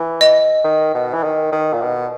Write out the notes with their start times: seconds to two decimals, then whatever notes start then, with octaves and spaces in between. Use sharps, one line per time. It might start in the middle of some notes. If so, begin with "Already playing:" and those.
Already playing: E3
0.21 D#5
0.64 D#3
0.94 B2
1.13 E3
1.24 D#3
1.52 D#3
1.73 A#2
1.82 B2